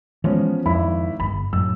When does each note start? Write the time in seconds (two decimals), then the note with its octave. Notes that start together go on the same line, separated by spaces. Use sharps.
0.24 E3 F3 G#3 B3 C#4
0.66 G#1 F2 E4 B5
1.20 G1 B5
1.53 F#2 A2 E6